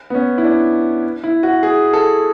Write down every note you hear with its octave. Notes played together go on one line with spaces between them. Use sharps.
B3
C#4
E4
D4
E4
F#4
G#4
A4